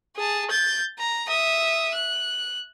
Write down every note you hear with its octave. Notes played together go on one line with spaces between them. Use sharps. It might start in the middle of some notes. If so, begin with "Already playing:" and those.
G#4 A5
G6 A6
A#5
E5 D#6
F#6